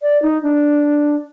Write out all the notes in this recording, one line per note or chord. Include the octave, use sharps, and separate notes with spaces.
D5
D#4
D4